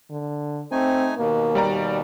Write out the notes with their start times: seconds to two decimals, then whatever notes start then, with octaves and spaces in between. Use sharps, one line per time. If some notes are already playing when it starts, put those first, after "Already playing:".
0.10 D3
0.72 A3 C4 D#4 G#5
1.18 D#2 B2 A#3
1.55 G3 D5 A#5